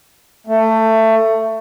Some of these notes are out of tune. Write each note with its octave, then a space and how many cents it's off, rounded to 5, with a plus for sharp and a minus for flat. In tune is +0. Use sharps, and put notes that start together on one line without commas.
A3 +20